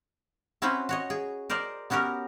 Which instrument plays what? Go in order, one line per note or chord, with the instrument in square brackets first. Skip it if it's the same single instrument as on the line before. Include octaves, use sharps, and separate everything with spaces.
[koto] C4 C#4 E4 F#4 B4 C5
F#4 C#5 D#5
G#4
A#4 C5 D5 D#5
B3 C#4 F#4 G4 A#4